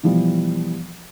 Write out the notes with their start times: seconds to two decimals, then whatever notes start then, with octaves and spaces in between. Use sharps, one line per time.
0.03 B2 E3 F3 G3